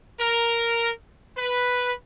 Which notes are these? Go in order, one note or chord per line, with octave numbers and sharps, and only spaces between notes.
A#4
B4